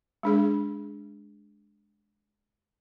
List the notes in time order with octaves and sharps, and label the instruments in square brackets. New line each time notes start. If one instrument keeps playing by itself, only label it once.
[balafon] G#3 D4 G#4